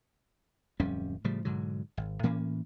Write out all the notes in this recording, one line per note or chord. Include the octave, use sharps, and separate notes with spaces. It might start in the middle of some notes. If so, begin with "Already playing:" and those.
D1 F2 G3 C#4
A2 C#3 F3 G3
G#2 B2 D3 F#3
G#1
A2 E3 A#3 C#4